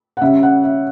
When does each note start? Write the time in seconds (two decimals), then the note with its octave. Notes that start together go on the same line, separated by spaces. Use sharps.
0.17 F#5
0.22 C#3 G3 C#4 E5
0.43 F#5
0.64 E5